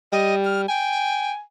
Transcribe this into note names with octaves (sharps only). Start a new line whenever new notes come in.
G3 D#5
F6
G5 G#5